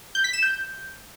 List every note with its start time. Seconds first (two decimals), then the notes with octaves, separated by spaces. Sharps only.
0.15 G6
0.24 B6
0.33 E7
0.43 G6